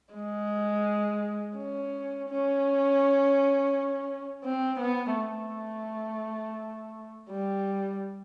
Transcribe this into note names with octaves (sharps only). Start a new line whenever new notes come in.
G#3
C#4
C#4
C4
B3
A3
G3